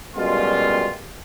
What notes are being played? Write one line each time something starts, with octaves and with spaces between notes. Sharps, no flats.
F#2 B2 G3 G#3 F4